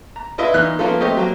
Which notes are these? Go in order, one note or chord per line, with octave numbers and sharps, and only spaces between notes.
A#5
D4 E4 F4 B4 D#5 E5
A#2 E3 D#4 F6 F#6
F3 A#3 B3 C#4 F4 A4
A3 C4 G4 C#5 D#5
F#3 A#3